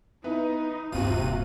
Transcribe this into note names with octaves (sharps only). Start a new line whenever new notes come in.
B3 D#4 E4 B4
D#1 G2 C3 F4 F#4 D#7